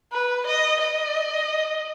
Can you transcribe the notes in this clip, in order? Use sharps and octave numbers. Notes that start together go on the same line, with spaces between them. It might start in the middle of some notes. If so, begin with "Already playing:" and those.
B4
D#5
D#5